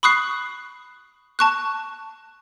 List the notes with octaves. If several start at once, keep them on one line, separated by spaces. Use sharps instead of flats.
B5 C#6 D#6 F#6 C7
A5 C#6 F#6